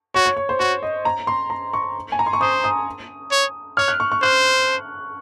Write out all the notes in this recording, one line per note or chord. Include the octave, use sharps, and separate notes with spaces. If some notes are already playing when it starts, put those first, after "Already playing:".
F#4 C#5
C#5
C#5
C5
F#4 C#5
D#5
A#5
C6
A#5
C#6
G#5
A#5
C6
C#6
C5 D#6
D#6
C#5
C#5 F6
F#6
C#6
C#6
C5 F#6